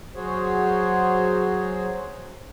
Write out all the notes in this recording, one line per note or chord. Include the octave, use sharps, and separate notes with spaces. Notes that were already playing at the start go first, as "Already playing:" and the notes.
F#3 F#4 G#4 C5 C#5